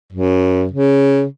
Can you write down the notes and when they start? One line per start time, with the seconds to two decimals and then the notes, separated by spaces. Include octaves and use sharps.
0.12 F#2
0.72 C#3